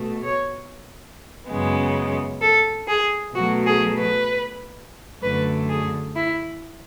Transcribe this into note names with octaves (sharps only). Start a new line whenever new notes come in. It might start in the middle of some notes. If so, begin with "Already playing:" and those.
Already playing: B2 A3
C#5
F#2 C#3 G#3 B3
A4
G#4
B2 F#3 A3 F#4
G#4
B4
F#2 D3 A3 B4
G#4
E4